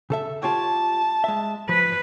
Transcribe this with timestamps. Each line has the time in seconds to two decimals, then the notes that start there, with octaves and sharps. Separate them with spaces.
0.10 C#3 A4 E5
0.43 F4 G4 C#5 A5
1.24 G#3 E5
1.69 F3 B4